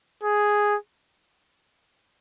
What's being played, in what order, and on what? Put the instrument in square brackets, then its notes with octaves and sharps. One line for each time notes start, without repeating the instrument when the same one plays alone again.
[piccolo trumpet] G#4